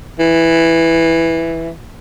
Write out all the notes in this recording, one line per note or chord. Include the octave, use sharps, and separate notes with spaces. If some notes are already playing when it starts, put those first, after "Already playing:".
E3